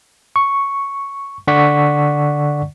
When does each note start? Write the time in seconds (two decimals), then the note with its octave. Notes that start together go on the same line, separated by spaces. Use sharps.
0.36 C#6
1.47 D3 D5 F#5 C#6 B6